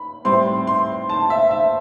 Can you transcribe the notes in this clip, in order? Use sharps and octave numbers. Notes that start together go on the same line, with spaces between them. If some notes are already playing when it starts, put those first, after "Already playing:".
Already playing: B5
A2 G3 C4 C6
C6
C6
A5
E5
E5